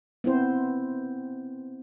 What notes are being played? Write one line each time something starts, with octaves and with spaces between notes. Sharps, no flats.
B3 C4 E4 C5